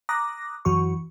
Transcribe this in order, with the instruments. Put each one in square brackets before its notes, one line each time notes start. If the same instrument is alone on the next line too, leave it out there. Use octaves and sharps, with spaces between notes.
[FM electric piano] A#5 D6 D#6 F#6 A#6
F#2 E3 F#4 C#6